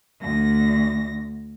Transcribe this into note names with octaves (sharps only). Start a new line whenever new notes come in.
D2 A#6